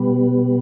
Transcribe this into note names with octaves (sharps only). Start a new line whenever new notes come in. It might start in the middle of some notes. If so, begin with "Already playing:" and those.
Already playing: B2 G3 B3